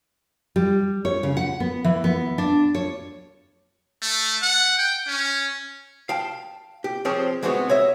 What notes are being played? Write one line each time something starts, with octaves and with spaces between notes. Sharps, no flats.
G3
C#5
C#3
F#5
B3
E3
B3
D4
C#5
A3
F#5
G5
C#4
F5 G5 A5
G4
F3 C4 G4 G#4 C5 C#5
E3 G#3 B3 C4 F#4 C#5
C#5 D#5 E5